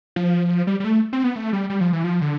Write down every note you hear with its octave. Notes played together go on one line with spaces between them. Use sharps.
F3
G3
G3
A3
C4
B3
A3
G3
G3
F3
E3
F3
D3